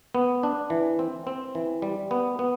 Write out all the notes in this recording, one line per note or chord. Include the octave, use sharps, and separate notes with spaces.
B3
D4
E3
C4
C4
E3
G3
B3
B3